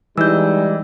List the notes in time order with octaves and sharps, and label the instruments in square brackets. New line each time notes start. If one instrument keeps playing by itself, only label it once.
[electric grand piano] E3 [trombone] G3 [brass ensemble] G#3 D#4 [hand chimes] E6 G6